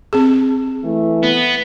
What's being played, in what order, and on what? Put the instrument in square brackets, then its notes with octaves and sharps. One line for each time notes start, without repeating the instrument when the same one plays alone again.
[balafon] C4 G#4
[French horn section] E3 A3
[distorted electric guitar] B3